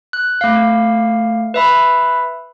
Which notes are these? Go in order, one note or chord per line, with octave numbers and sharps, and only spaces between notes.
F#6
A3 F5
B4 E5 B5